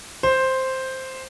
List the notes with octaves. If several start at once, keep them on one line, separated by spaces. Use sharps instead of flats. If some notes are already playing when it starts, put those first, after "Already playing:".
C5